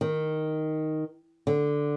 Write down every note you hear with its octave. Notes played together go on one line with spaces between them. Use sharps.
D#3
D3